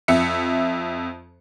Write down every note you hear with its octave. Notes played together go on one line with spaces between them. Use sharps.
F2 E5 C#7